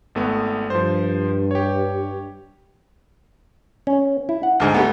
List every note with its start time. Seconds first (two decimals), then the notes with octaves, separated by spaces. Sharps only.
0.15 G#1 A3 B3
0.70 G2 F3 C5
1.51 G4 C#5
3.87 C#4
4.29 E4
4.43 F#5
4.60 D2 G#2
4.74 G3 A3 B3